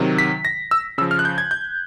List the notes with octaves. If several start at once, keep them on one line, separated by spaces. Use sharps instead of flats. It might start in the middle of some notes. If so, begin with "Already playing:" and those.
Already playing: C3 D#3 F#3
B6
A#6
E6
C#3 F3 E6
F6
F#6
G6
G#6
G6